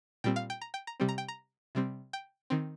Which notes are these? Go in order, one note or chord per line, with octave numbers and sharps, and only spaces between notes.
A#2 G3 C4 G5
F5
G5
A#5
G5
A#5
C3 G3 C4
A#5
G5
A#5
C3 G3 C4
G5
D#3 C4